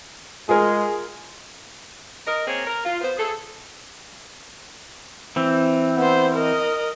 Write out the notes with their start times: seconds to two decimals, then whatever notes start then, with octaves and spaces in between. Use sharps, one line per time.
0.49 G#3 F4 G#4 A#4
2.27 A#4 D#5
2.47 A#3 C4 G#4 A#4 C#5
2.67 A#4
2.85 F4
3.01 B3 C5
3.18 G#4 A4
5.36 E3 C4
5.97 B3 C5
6.34 A#4 D#5